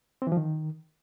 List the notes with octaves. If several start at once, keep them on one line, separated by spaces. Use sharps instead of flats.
C4
E3
F3
D#3